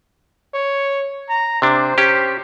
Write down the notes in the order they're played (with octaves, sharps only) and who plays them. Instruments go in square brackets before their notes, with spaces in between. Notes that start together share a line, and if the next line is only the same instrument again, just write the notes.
[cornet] C#5
A#5
[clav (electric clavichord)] C3 D4 [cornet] C5
[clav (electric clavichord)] C#4 G4